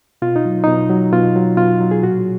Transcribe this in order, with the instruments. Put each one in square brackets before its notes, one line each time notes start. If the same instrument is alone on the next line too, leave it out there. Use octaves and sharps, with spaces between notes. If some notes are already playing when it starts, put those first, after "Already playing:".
[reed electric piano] B2 F4
D#4
F#3
B2 D#4
F#3
B2 F4
F#3
B2 F4
F#3
G#4
A#2 F#4